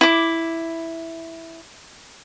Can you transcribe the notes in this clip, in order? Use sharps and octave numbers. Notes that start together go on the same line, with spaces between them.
E4 D6